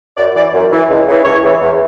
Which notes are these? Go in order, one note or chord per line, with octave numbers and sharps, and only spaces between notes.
F#2 D5
E3 D5
F#2
E3
C#2
C#3 E3
C#2 C#5
C#3 E3
E2